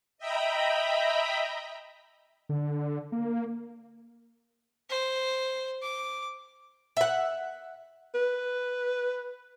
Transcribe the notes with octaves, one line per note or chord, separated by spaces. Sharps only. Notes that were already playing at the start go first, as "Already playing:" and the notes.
D#5 E5 G5 A#5 B5
D3
A#3
C5
D6
E5 F#5
B4